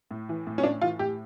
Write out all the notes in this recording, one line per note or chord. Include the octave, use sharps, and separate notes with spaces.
A2
E3
A2
C#4
A2 D4
E3 F4
A2 G4